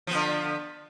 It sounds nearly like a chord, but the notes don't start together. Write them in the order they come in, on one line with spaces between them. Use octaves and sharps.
F3 B3 D3